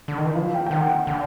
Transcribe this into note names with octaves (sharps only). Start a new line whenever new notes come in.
D3
D#3
E3
F3 F5
G5
G5
D#3 F#5
F#5
D3